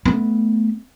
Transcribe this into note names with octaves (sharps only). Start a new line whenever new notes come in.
A3 B3